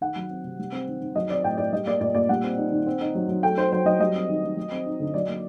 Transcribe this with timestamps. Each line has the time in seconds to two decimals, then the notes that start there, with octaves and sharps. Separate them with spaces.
0.01 D#3 F#5
0.16 F#3
0.30 C4
0.44 C3
0.59 G3
0.72 C4
0.87 D#3
1.01 D#3
1.15 F#3 D#5
1.29 C4 D5
1.44 A2 G5
1.58 A2 D5
1.73 G3 D#5
1.86 A#3 D5
2.01 A#2 D5
2.15 A#2 D5
2.29 G3 F#5
2.44 C4
2.58 D#4
2.72 D#3
2.87 C4
3.01 D#4
3.15 F#3
3.28 F#3
3.43 A3 G5
3.57 D#4 C5
3.72 F#3 C5
3.85 F#3 D#5
4.00 G3 D#5
4.15 C4
4.29 D#3
4.43 D#3
4.57 F#3
4.72 C4
4.86 D#4
5.00 D3
5.14 F#3 D5
5.28 A#3